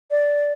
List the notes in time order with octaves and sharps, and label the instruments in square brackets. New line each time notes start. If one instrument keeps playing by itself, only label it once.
[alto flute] D5